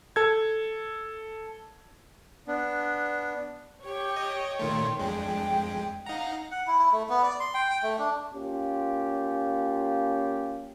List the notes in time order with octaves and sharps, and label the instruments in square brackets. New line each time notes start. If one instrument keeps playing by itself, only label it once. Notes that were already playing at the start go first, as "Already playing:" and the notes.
[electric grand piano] A4 G#6
[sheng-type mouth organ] B3 D4
[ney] G4 [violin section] C#5 G5 C#6
[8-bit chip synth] D#5
[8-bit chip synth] A#2 D#3 A3 [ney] C6
[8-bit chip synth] F2 G#3 [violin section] D4 [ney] G5
[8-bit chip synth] D#4 A#5 [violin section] F5 F#5
[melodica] F#5
E4
E4
A3
B3
D5
C6
G5
G5
A3
D4
[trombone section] A#3 C#4 F4 G4